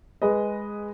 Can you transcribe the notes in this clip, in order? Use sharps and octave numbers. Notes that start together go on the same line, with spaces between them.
G#3 G#4 B4 D#5